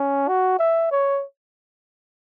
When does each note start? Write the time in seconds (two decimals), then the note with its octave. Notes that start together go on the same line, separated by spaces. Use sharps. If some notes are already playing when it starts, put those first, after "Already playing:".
Already playing: C#4
0.28 F#4
0.59 E5
0.91 C#5